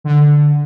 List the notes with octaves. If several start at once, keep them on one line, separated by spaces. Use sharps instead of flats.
D3